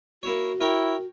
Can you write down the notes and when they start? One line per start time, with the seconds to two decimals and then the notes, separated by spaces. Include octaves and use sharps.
0.23 A#3 E4 F#4 C#5
0.61 E4 A#4 C#5 G5